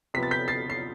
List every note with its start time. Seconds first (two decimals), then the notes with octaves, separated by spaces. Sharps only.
0.14 C3 F3 B3 B6
0.23 A6
0.31 G6 B6
0.48 A6 C7
0.70 C7